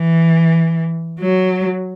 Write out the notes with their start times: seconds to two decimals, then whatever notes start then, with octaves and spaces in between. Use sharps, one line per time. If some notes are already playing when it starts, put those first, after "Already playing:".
Already playing: E3
1.20 F#3